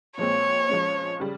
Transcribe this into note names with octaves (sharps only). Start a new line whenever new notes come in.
A#2 F3 G#3 C4 C#5
F3 G#3 C#4
C#3 G3